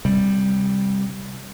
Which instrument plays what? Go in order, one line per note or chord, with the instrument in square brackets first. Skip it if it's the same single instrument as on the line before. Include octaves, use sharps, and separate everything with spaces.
[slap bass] C3 G3